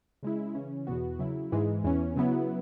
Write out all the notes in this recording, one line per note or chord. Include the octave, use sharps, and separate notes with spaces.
C#3 G#3 E4
C#3 E3 C#4
E2 B2 B3 F#4
C#3 F#3 E4
G#2 E3 G#3
E2 E3 C#4
C#3 F#3 B3 E4